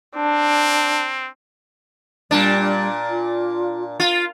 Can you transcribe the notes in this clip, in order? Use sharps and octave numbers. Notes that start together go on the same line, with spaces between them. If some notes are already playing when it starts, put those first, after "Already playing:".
C4 D4
A#2 G3 D4
F4
F4